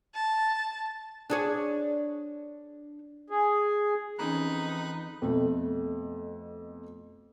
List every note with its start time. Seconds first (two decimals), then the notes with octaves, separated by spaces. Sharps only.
0.15 A5
1.30 D4 G#4 C#5
3.30 G#4
4.19 F2 E3 C#4 D#4 G#4 A#5 B5 F#6
5.22 F2 B2 A3